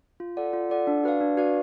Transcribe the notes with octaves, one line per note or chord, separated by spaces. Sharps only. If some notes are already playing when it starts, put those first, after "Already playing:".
F4
A4 D5 F#5
F4
A4 D5 F#5
D4
F#4 B4 D5 F5
D4
F#4 B4 D5 F5